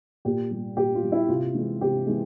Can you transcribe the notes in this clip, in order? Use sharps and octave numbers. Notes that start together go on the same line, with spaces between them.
A#2 G4
G3
A#2 G4
F4
G3
E4
C3 F4
E3 G#3
C3 G4
E3 G#3